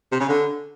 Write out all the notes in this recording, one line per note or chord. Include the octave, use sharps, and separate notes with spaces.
C3
C#3
D3